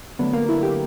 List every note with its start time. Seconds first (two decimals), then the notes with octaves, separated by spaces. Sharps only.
0.19 D3 F#3 A3 B3
0.33 A#3
0.49 E4
0.63 G4